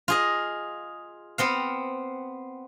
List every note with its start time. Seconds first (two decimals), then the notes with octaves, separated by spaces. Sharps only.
0.08 F4 G#4 D#5
1.38 B3 C4 F5